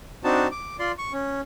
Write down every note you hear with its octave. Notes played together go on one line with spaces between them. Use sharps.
C4 D4 D#4 F#4 A5
D6
F4 D5 C6
C#6
C#4